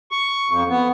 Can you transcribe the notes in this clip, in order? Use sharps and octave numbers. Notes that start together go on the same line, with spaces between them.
C#6
F2
B3